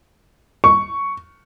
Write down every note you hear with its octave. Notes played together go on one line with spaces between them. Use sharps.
C#6